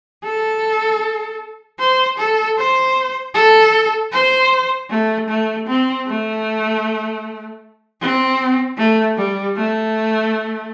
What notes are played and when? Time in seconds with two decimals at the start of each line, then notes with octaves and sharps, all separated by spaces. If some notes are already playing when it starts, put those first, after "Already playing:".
0.23 A4
1.79 C5
2.18 A4
2.58 C5
3.35 A4
4.12 C5
4.90 A3
5.29 A3
5.67 C4
6.07 A3
8.01 C4
8.77 A3
9.17 G3
9.56 A3